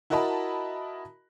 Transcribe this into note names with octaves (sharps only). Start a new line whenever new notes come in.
E4 F#4 A#4 D#5 A5 B5